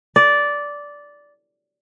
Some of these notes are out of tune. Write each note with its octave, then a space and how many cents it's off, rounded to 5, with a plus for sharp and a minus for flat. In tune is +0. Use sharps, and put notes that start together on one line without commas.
D5 -10